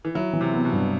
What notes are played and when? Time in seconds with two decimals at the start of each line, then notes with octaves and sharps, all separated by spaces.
0.05 E3
0.15 F#3 E4
0.33 E3
0.41 C3
0.53 B3
0.65 B2
0.73 G2